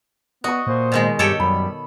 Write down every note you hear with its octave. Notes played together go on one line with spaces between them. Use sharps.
B3 F#4 D#5 C#6
A#2 C5
B2 D#3 G#3
G2 G4 A4 C#5 G5
F#2 G3 B5